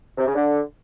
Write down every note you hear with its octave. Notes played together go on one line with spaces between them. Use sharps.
C3
C#3
D3